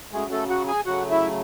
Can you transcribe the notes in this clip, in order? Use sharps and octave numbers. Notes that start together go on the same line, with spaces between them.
C#3 F#3 G#3 A3 G#4
A3 A4
F#4 F#5
G#4 G#5
C#3 F#3 A3 F#4 F#5
E4 E5